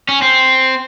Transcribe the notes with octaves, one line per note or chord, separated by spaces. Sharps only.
C#4
C4